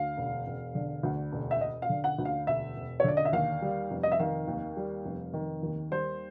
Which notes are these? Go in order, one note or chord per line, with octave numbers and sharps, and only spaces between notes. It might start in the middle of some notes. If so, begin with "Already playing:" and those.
Already playing: D2 F5
E1
E1
D3
D2
E1
E5
E1 D#5
F5
D3
F#5
D2
F5
E1 E5
E1
C#5
D3 D5
D#5
E5
D#2 F5
G3
F1
D#5
E5
D#3 F5
D#2
G3
F1
D#3
D#2
G3 C5